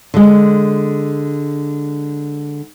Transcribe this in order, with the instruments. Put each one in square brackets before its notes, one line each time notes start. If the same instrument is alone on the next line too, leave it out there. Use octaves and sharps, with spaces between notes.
[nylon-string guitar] D3 G#3